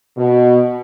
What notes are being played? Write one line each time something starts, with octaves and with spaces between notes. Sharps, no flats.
B2